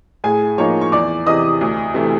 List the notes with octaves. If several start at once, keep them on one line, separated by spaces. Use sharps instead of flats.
A2 G#4 G#5
F3 A#3 D#4 C#5 C#6
C#6
E2 D5 D6
C3 E3 D#5 D#6
D2
C3 E3 A3